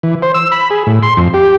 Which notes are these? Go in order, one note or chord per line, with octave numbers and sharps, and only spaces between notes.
E3
C5
E6
B5
G#4
A2
C6
F2
G4